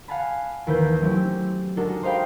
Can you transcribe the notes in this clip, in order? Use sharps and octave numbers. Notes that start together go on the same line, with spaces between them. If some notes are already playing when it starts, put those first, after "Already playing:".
F5 F#5 G#5 A5 B5
D#2 E3 B4 G6
E5
F#3 A3 C4 C#4 E4 G4
G#3 D4 D#4 F#4 A4 A#4
C5 D#5 F5 G5 B5